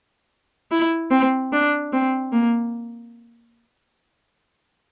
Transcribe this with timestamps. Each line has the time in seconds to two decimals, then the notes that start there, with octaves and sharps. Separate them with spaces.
0.71 E4
1.11 C4
1.52 D4
1.93 C4
2.32 A#3